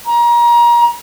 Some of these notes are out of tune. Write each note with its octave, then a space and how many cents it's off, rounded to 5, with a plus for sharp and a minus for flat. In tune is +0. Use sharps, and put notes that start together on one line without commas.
A#5 +30